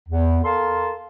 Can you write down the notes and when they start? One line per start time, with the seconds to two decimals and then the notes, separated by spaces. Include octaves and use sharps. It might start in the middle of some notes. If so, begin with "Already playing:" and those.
0.08 E2
0.43 A4 A#4 F5 A5 C6